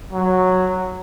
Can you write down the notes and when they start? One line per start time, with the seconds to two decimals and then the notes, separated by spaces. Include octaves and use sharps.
0.13 F#3